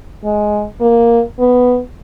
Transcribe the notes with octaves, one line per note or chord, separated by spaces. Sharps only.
G#3
A#3
B3